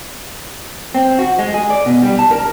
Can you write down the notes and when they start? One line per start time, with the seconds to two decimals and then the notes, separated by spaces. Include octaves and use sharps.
0.94 C4
1.19 F#4
1.39 G#3
1.54 G#4
1.70 D5
1.86 B2
2.02 G3
2.19 A5
2.31 A#4